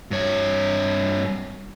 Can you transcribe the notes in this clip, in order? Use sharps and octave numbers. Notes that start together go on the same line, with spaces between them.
G2 C#5